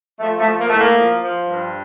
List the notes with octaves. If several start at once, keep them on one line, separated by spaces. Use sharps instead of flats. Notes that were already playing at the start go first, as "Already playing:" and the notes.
F3 A3
A3
F3
A#3
A2 A3
A#3
F3
F3
G2